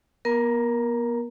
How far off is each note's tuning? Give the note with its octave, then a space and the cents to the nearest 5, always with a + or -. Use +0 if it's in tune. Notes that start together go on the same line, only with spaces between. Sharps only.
B3 -40 A#4 +15 A#5 +0